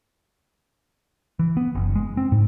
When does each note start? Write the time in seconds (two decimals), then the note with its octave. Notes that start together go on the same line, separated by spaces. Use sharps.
1.39 E3
1.57 B3
1.75 F#1
1.95 G#3
2.17 C4
2.32 G#2